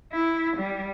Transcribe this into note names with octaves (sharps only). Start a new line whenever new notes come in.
E4
G3